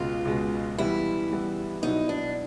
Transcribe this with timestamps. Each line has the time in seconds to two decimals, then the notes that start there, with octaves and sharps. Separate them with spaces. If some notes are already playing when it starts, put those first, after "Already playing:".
Already playing: C#2 B2 G#3 F4
0.25 C#2 B2 G#3
0.78 E3 G3 B3 E4
1.31 E3 G3 B3
1.83 B2 F#3 B3 D#4 E4
2.09 D4